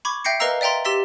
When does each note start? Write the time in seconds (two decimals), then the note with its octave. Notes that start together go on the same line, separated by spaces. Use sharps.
0.05 B5 C#6 D6 G#6
0.25 E5 G5 G6 A#6 C7 C#7
0.40 A#4 B4 D#5 F5 A#5 E6
0.61 D5 E5 G5 A#5 C6
0.85 G4 C6 E6 A6 B6 G7